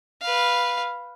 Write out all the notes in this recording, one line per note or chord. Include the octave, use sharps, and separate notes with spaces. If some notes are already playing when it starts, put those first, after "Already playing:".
B4 F5